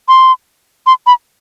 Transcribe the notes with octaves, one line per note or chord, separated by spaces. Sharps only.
C6
C6
B5